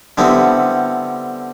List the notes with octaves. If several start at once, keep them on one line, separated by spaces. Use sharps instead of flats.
D3 G3 B3 C4 E4